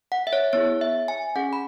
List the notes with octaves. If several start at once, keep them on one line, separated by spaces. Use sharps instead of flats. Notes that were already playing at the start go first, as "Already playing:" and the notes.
F#5
E5
C#5
B3 E4 G#4 C#5
E5
G#5
C#4 G#4 F#5
B5